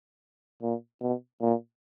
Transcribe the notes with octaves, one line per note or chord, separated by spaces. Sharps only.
A#2
B2
A#2